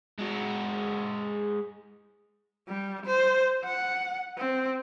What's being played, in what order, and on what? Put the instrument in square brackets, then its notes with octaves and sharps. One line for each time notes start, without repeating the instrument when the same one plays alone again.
[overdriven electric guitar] G#3 F#4
[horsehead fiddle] G3
C5
F#5
C4